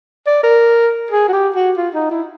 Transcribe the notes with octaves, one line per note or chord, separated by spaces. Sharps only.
D5
A#4
G#4
F#4
G4
F#4
F4
D#4
E4